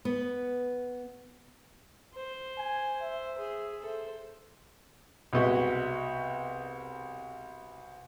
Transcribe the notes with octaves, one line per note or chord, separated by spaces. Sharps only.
B3
C5
G#5
E5
G#4
A4 C5
C2 B2 G#3 F#4 B4 D#5